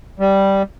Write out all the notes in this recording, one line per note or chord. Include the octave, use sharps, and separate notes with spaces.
G3